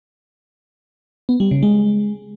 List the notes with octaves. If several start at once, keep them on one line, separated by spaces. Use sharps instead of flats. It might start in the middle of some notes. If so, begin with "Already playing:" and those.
B3
G3
C#3
G#3